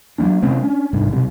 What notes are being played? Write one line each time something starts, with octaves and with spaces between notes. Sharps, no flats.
F#3 G3 A#3 D4
C3 G#3 C4 C#4
C#4 D4
G1 C2 G#2 D3
B1 C3